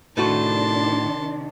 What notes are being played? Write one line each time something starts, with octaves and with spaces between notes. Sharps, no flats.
A2 C3 D#3 A3 D4 F#4 A5 C6